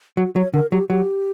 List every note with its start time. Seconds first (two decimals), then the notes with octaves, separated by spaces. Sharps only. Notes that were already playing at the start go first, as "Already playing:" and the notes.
0.17 F#3 F#4
0.36 F#3 C#5
0.54 D3 A#4
0.72 F#3 G4
0.90 F#3 G4